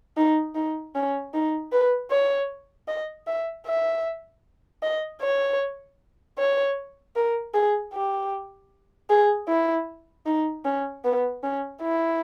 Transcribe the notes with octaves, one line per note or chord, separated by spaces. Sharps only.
D#4
D#4
C#4
D#4
B4
C#5
D#5
E5
E5
D#5
C#5
C#5
A#4
G#4
G4
G#4
E4
D#4
C#4
B3
C#4
E4